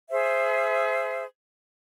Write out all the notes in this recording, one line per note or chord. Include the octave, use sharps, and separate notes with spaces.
G#4 C5 E5